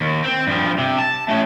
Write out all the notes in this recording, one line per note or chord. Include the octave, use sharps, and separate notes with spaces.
D#2
C4
G2 F3
C3
A5
A3 C#4